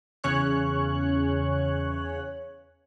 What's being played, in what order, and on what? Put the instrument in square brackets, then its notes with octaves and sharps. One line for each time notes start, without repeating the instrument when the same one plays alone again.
[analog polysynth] E2 C#3 C#4 C#5 F#6